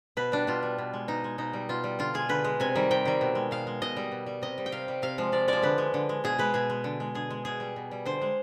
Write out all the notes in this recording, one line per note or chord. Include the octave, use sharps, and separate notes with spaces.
B2 B4
G3 D4
B2 F4
G3
B2
G#3
B2 D#4
G#3
B2 D#4
G3
B2 F4
G3
D3 F4
G#3 G#4
D3 B4
G#3
C3 G#5
D#3 G3
C3 G5
D#3 G3
B2
G#3
B2 F5
G#3
B2 D#5
G3
B2
G3
C3 D#5
G3
G5
C3 F5
G3
C3 F5
F3 G#3
C3 D5
F3 G#3 D5
D3 B4
G#3
D3
G#3
B2 G#4
G#3 B4
B2 G#4
G#3
D3
G#3
D3 G#4
G#3
B2 G#4
G3
B2
G3
D3 C5
G#3